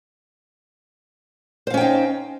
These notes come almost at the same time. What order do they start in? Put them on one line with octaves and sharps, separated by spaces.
C5 F5 C#4 G5 D#4